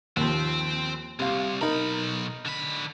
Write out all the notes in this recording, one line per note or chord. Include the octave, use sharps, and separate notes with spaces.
D#2 F3 C4
C2 C3 F5
B1 D#4 A#4 B5
D3 B5